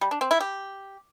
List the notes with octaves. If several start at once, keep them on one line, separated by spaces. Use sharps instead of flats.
G3
D4
C4
E4
G4